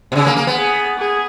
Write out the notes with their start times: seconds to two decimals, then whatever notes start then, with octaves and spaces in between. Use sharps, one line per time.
0.12 B2
0.15 C#3 G#4
0.26 A#3
0.37 A#3
0.47 B3
0.57 G#4
0.98 G#4